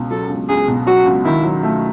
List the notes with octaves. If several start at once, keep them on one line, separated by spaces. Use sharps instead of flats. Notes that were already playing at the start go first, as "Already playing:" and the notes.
Already playing: C#2 B2
F#3 A4
C#2
C#2 G#4
B2
F#3 F#4
C#2
D#3 E4
F#3
A3